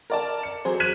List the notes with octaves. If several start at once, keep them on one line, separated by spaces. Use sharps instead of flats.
A#4 D5 A5
C#7
F#3 G#4 C5
F6 F#6 G#6 B6 D#7 E7